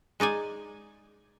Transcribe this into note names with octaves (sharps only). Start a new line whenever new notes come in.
G#3 D#4 D5 G#5